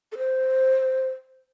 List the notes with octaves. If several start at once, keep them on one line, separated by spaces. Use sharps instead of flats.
A4
C5